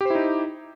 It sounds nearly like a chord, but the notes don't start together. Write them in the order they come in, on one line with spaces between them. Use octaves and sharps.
G4 C5 E4 D#4